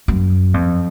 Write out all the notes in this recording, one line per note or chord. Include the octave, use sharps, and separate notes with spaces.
F#2
F2